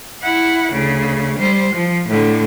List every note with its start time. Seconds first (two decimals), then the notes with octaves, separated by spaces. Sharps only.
0.23 E4 F#5
0.72 D2 C#3
1.39 G3 C5
1.73 F3
2.08 A2 D3